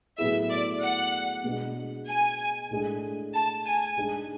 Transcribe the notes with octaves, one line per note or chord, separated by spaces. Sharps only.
A2 F#3 B3 E4 G#4 E5
D5
F#5
B2 G#3 D4 G#4
G#5
A2 G#3 D4
A5
G#5
G#2 G#3 D4 G#4